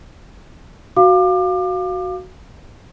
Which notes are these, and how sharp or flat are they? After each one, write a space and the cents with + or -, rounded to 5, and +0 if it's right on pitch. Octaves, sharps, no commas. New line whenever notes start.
F#4 +0 F5 +0 D6 +30